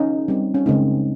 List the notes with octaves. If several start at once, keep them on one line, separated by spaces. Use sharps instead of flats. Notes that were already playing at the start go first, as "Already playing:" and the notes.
Already playing: C#4 D#4
G3 C4
C#4
C#3 G#3 C4 D#4